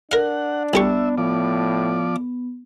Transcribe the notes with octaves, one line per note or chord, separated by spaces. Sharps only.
D4 A#4 F5 F#5
C2 B3 G4 E5 C#6
A2 F3 D5